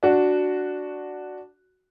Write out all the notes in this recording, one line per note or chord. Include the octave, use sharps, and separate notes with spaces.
D4 F#4